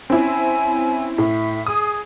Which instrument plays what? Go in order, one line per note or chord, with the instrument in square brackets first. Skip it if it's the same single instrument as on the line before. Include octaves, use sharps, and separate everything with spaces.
[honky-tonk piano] C4 C#4 E4 [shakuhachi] G#5
[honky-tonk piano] A2 [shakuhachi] E5
[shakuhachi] G#4 [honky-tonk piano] D#6